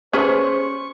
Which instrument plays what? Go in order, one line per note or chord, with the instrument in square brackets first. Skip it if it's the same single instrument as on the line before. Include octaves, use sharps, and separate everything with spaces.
[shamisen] C#4 G#4 B4 [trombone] C5 [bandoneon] C#6